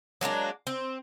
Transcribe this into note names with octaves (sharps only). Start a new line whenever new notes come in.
F#3 G#3 A#3 D4
C4